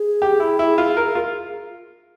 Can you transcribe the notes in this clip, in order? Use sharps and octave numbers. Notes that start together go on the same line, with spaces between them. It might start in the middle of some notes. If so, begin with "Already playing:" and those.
Already playing: G#4
G4
E4
E4
F4
A#4
F4